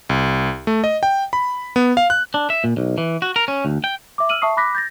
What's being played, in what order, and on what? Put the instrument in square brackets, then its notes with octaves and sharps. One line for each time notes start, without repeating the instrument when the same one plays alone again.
[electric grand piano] C2
A3
D#5
G5
B5
B3
F5
F#6
[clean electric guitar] D4
E5
A#2
B1
E3
F#4
A#4
C#4
D2
G5
[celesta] E5 D6
E6 F6 D#7 F#7
E5 A5 C#6 D#6 C7
B5 D6 F#6 A#6 B6
G6 A6 A#6